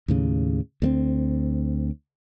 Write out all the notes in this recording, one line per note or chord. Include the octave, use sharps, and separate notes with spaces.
D#2 A2 C#3
D2 G#3 C4